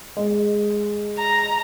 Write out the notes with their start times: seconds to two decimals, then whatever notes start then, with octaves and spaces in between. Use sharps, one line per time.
0.17 G#3
1.18 A#5